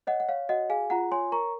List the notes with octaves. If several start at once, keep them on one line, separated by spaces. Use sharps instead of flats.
C#5 D#5 F#5
F#5
C#5 F5
F#4 D#5 F#5
G#4 F5 G#5
F4 F#5 A#5
C#5 G#5 C6
A#4 A#5 C#6